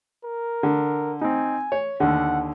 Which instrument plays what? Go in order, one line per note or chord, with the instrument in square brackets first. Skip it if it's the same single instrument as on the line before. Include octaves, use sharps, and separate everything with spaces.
[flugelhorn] A#4
[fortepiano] D3
[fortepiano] C4 D#4 [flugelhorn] G#5
[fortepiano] C#5
[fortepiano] D#2 D3 [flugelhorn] F#5